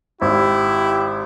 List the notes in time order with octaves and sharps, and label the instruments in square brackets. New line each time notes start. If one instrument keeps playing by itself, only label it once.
[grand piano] G#1 [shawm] E4 [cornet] G4